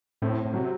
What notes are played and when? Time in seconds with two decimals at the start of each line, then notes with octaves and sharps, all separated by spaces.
0.22 A2 C4
0.46 A2
0.54 C3 F#3